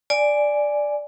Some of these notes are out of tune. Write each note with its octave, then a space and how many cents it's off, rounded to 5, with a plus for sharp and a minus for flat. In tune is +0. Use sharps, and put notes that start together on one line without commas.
D5 +0 G#5 +0